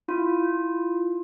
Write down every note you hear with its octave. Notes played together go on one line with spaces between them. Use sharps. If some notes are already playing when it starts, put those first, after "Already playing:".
E4 F4